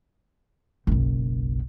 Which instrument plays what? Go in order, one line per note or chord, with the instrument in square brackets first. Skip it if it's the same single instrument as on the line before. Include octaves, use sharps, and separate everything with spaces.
[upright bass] F#1 B1